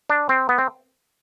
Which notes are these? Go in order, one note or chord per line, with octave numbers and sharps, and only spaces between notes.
D4
C4
B3
C4